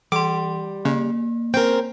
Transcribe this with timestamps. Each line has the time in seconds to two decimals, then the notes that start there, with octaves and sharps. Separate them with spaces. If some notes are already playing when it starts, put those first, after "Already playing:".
0.12 E3 G3 C6 D6
0.85 C#3 A#3
1.54 C4 C#4 A#4 G5